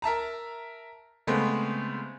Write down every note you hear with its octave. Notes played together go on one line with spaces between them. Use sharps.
A#4 E5 A5 A#5
C#3 G#3 A3 B3 C4